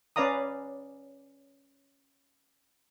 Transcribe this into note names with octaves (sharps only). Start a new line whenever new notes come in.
C#4 B4 D5 F5 A#5 D#6